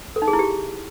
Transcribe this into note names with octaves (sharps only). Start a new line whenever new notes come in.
A4
D#4
G#4
E4
G4